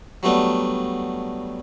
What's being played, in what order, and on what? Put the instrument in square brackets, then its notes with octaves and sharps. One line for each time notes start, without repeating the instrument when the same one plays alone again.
[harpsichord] F#3 G3 A3 B3 D4